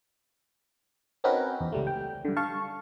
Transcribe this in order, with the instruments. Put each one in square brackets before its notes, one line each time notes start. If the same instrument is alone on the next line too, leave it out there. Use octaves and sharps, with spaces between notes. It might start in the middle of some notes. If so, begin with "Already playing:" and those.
[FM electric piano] C4 C#4 D#4 F#4 A#4 B4
E2
C#2 G3 A3
G5
G2 D3
F5 A5 C#6